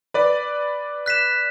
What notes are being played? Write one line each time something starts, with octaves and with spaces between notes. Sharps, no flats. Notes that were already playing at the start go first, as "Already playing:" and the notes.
B4 D5
F#6 B6 E7